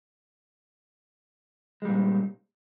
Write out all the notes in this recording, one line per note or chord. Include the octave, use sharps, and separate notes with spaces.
A#2 G3 G#3